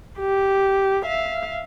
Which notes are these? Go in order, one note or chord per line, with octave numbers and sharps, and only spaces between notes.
G4
E5 F5